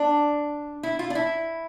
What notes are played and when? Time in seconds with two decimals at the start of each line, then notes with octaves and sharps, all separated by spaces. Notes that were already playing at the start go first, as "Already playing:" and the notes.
Already playing: D4
0.83 E4
0.99 F4
1.10 D4
1.15 E4